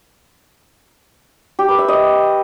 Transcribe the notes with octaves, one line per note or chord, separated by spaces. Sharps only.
G4
B4
E5
D#5